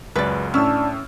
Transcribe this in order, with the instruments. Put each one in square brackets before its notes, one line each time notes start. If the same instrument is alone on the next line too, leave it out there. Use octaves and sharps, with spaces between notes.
[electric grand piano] C#2 F#2 G#3 [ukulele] B4 D5
[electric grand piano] A2 E6 F6 [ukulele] C#4 [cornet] D4